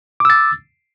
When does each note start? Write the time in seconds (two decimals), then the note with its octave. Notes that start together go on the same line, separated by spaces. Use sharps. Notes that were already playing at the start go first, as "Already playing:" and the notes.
0.20 D6
0.25 E6
0.30 A6